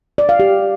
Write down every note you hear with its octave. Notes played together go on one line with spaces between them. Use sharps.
D5
F5
G4